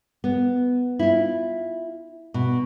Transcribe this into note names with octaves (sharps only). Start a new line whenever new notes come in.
B3
E4 F4
B2